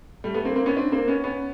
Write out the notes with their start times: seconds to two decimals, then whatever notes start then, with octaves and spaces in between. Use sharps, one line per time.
0.24 G3 A3
0.34 A3 B3
0.45 A#3 C4
0.56 A#3 C4
0.66 B3 C#4
0.76 C4 D4
0.92 A#3 C4
1.08 B3 C#4
1.24 B3 C#4